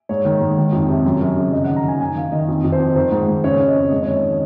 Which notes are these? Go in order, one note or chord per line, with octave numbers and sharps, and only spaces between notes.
G#2 C#5
D#3
G#2
D#3
F2
C3
F#2
F#2
C#3
F#2 D#5
D#3 F#5
A#5
D#3 G#5
D#3 G#5
D#3 F5
D#3 D#5
F2
F2
C5
F2
D#3 C5
G#2
G#2
C#3 C#5
C#3
D#5
F2
G#2 D#5
C#5
D#3 D#5
C#5